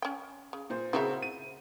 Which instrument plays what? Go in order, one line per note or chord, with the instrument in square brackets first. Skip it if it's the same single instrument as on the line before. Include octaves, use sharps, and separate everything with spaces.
[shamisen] C#4 G5
C#3
[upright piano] A#2 C5
[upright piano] C#3 C4 E5 [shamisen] E4 F#4 A#4
[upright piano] D#7